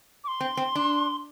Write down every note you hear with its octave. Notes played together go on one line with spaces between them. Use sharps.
D6
C6
C4
C4
D4